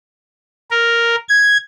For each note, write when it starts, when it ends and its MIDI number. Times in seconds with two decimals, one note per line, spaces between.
0.71 1.16 70
1.29 1.57 92